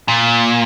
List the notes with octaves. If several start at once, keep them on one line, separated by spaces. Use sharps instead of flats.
A#2